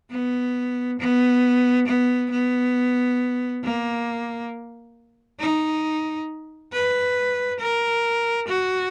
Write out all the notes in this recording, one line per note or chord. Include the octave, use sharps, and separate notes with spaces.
B3
B3
B3
B3
A#3
D#4
B4
A#4
F#4